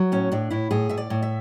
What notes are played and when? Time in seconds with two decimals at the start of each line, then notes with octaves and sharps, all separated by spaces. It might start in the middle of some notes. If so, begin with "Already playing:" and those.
Already playing: F#3
0.12 A2 C#4
0.32 A2 D4
0.50 A2 E4
0.71 A2 G#4
0.89 A2 E5
0.97 D5
1.10 A2
1.23 E5